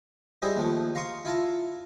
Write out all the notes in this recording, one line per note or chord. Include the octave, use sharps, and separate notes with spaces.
G3 E4 G#4 C5 D#5
D#2 F3 A3
F5 A#5 C6 C#6 D#6
E4 F4 A5 A#5